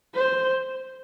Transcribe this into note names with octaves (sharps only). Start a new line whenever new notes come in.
C5